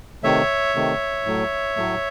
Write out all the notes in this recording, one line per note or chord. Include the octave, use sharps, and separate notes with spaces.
C3 D#3 A3 C#5 E5
C3 D#3 A3
A2 F#3 A3
A2 F#3 A3